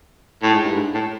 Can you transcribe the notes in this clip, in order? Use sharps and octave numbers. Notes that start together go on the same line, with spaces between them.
A2
G#2
G2
G#2
A2